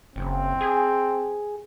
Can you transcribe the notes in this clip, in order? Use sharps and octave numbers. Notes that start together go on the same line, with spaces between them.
F#1 C4
G#4